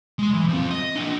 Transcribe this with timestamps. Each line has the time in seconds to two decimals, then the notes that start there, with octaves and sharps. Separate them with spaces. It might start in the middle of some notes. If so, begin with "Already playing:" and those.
0.19 G#3 C6
0.34 E3
0.49 F3 C4
0.71 D#5
0.96 A#3 D4